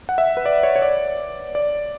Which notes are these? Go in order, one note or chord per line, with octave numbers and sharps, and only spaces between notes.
F#5
E5
B4
D5
C#5
C#5
D5
D5